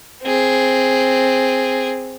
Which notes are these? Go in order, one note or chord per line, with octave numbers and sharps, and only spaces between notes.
C4 G#4